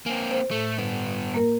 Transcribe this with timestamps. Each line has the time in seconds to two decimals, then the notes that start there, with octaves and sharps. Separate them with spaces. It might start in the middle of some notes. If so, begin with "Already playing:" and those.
0.06 A#3 C4 G#5
0.31 C5
0.51 A2 A3
0.78 G2 B3
1.34 A#3 A#4